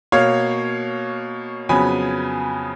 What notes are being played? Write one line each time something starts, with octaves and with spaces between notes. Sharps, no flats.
B2 A#3 C#5 F5
F2 C#3 F#3 B3 G#5 B5